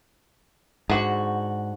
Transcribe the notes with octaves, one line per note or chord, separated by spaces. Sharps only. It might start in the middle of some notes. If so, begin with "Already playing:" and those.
G#2 D3 F#4